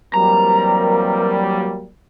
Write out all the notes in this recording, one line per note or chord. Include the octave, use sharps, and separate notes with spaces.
E3 F#3 G3 A#3 C4 A#4 A#5